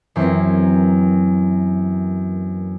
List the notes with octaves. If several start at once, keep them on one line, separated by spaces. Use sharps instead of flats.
F#2 E3 A#3 C4